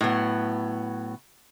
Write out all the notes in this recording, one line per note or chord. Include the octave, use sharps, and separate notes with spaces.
A2 F#3 B3